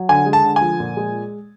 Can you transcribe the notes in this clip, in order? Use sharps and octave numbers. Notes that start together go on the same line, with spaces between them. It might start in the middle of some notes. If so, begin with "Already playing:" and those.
Already playing: F#3
D3 G#5
G#3
A5
D3
F3 G#5
A#2
G#3